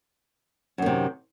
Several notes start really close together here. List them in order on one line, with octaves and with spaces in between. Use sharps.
F#2 D#3 C3